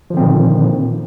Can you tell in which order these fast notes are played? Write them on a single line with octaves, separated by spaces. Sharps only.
F3 D3 C4 A#2 D#3